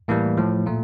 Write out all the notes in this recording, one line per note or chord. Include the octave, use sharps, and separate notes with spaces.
A2 E3 G3 A#3
A2 F3
A#2 A3